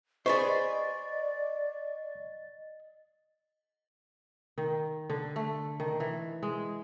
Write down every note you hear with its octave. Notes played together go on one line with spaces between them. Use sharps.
G#4 B4 C5 D5 D#5 C#6 A6
D#3
D3
A3
D#3
E3
G#3